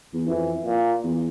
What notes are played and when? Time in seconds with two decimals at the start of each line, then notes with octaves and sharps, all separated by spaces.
0.14 E2
0.27 F2 E3
0.66 A#2
1.04 E2